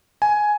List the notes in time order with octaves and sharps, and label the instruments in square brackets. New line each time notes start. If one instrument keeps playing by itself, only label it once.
[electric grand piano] G#5